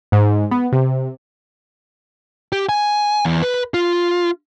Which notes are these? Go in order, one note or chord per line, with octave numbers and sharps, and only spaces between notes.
G#2
B3
C3
G4
G#5
E2
B4
F4